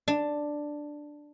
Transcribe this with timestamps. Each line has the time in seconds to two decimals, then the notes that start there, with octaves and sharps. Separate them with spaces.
0.08 D4